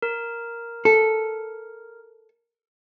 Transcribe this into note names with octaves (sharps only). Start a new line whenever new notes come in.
A#4
A4